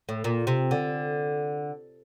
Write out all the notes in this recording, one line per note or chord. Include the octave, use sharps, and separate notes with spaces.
A2
A#2
C3
D3